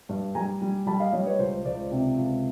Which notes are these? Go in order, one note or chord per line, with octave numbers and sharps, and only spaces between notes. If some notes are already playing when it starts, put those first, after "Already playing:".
G2
G3 G#5 A#5
G3
G3 A5 B5
D#5 F5
G3 C#5 D#5
B4 C#5
C#2 C5
C#2 C5 D5
C3
C#2